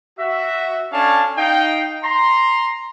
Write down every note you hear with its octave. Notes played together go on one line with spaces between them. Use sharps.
F#4 E5
C#4 D4 A4 C#5 F5 A5
D#4 F5 G5
A#5 C6